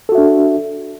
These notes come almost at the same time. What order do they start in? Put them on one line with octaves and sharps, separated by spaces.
A4 F#4 E5 D4